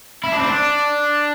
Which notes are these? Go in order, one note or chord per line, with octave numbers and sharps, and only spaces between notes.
E4
D4
C4
D4